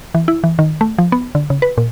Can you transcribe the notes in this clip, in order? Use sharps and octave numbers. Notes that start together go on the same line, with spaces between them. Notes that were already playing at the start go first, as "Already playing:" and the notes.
E3
E4
E3
D#3
A3
F3
B3
D3
C#3
B4
A#2